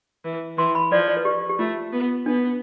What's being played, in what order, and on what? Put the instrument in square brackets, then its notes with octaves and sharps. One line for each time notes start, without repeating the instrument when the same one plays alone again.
[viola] E3
[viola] E3 [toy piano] C6
[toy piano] B5
[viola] F3 [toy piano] D5
[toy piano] C5
D5
B4
G4
G4
[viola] A3 [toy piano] F4
[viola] B3
[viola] B3 [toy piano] D4